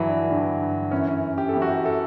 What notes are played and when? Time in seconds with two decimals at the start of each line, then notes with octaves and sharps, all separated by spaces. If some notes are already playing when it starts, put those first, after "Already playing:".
Already playing: G2 D3 E3 F#3
0.08 D4
0.30 G2 D3
0.91 F#2 E3 C#4
1.08 C#4
1.38 G4
1.49 A4
1.53 F#2 E3 G4
1.62 F#4
1.69 G4
1.85 A4